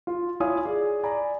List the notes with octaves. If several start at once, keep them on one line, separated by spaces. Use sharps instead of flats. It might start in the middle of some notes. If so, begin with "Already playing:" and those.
F4
E4 F4 C#5 F5 G#5 D#6
G#4 D5
D5 G#5 A#5 B5